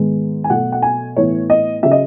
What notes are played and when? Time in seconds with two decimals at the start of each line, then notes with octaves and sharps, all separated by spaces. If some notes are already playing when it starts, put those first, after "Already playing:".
Already playing: G#2 D#3 G#3 B3
0.44 G#5
0.50 B2 F#3 A3 F#5
0.72 F#5
0.82 G#5
1.16 A2 E3 B3 C#5
1.50 D#5
1.83 C#3 F#3 E5
1.91 D#5